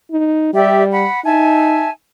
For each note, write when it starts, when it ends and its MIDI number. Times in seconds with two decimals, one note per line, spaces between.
0.11 0.51 63
0.53 1.05 55
0.53 0.83 67
0.53 0.83 74
0.53 0.83 76
0.91 1.19 78
0.91 1.19 83
1.25 1.87 63
1.25 1.89 76
1.25 1.89 80
1.25 1.89 81